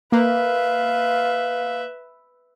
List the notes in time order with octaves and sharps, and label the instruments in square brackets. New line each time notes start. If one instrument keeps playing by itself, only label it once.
[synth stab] A#3 [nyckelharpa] B4 E5 [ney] F5